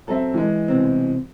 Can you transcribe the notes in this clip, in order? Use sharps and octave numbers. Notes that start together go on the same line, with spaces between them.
F#3 C4 A4 E5
E3 G#3
C2 B2 C4